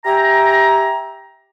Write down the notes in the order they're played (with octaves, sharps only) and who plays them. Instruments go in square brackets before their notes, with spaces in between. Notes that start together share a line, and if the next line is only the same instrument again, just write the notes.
[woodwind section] G4 E5 G5 G#5 A#5